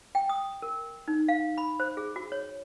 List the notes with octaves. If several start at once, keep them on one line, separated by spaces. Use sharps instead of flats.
G5
D#6
A#4
D#4
F5
B5
C5
G#4
F#4
C#5